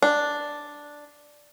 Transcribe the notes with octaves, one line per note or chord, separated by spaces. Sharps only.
D4